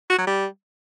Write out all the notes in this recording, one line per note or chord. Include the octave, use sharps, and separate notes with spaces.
F#4
F#3
G3